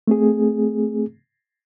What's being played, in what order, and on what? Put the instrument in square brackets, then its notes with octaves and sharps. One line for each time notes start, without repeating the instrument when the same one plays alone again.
[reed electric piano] A3 C4 G#4